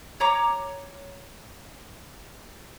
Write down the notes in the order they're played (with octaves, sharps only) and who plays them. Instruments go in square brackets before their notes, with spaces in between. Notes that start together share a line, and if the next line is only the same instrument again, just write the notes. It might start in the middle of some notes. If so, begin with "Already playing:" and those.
[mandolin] C#5 A#5 D6